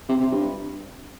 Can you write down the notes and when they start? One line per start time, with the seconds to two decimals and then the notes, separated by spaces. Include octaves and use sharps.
0.09 C3
0.20 C3
0.32 G2